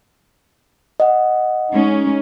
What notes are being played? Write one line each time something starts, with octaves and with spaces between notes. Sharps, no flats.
D#5 F#5
G#3 C#4 D#4